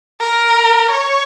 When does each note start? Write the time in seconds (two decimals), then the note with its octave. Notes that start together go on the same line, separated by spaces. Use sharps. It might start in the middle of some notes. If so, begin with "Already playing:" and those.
0.21 A#4
0.91 C#5